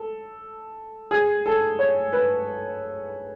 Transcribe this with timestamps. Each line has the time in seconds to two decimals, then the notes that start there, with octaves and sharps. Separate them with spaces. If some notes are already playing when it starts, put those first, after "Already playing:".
Already playing: A4
1.11 G#4
1.46 A4
1.79 C#5
2.13 B4